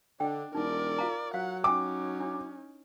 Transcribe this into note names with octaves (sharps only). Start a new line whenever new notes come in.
D3 D4 D#5 G5
E1 D#4 A#4 D5
F4 F5 A#5
F#3 F5 F#5
C#4 D#4 G5 G#5 D6
D4 E4